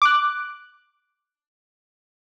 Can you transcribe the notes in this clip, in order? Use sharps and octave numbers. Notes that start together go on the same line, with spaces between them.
D6 F#6